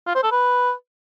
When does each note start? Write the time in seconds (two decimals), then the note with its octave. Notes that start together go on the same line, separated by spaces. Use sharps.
0.07 F4
0.15 C5
0.23 A4
0.32 B4